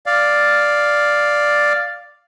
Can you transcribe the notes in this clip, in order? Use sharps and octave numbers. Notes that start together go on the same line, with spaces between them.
D5 F5